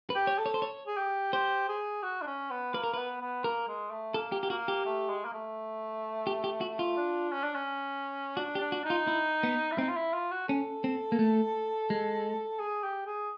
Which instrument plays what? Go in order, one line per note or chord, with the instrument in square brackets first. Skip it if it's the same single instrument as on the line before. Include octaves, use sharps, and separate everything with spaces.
[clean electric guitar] B4
[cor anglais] G4
[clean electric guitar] C#5
[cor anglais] A4
[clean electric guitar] C#5
C5
C#5
[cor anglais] G#4
G4
[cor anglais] G4 [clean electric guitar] C5
[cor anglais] G#4
F#4
D4
C#4
B3
[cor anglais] A#3 [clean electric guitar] B4
[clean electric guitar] A#4
[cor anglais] B3 [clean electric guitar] B4
[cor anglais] B3
[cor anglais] A#3 [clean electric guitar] A#4
[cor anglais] G#3
A3
[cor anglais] A#3 [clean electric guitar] A4
[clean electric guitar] G4
G4
[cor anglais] A#3 [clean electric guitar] F#4
[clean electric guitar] G4
[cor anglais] A3
G#3
A#3
A3
[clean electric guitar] G4
G4
F#4
F4
[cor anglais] D4
C#4
D4
C#4
[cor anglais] D4 [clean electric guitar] F#4
[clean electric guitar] G4
[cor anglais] D4
[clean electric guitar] F#4
[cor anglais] D#4
[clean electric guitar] F4
E4
B3
[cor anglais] E4
[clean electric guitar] C4 [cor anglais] D#4
[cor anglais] F4
E4
F4
F#4
[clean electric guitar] C#4 [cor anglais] A4
[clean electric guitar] C4
A#3
A3
G#3
[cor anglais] G#4
G4
G#4